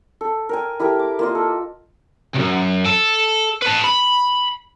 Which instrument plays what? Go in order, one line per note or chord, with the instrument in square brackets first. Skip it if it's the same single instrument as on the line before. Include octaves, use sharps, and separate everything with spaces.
[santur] A4
A#4 G5 G#5
E4 G4 A4 A#4
D6
A#3 F4 D#5
A4
[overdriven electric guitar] C2 F#2
A4
B4 A5
B5